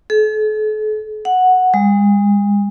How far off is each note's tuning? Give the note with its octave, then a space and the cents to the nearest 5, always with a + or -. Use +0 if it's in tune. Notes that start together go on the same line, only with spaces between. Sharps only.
A4 -45
F#5 -5
G#3 -40